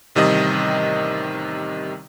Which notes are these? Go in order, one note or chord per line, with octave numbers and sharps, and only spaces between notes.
A1 C3 D#3 G3 D#5 D#6